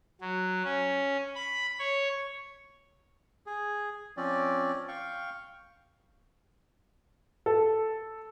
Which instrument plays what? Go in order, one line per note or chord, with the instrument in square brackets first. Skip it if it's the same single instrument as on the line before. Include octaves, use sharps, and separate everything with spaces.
[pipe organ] F#3
C#4
B5
C#5
[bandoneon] G#4
F3 C4 C#4 D5
F5 G5 C#6
[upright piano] A4